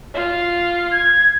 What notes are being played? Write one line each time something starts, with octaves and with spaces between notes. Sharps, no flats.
F4
G#6